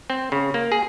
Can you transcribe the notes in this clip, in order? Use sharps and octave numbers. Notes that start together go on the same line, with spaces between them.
C4
C#3
A#3
G#4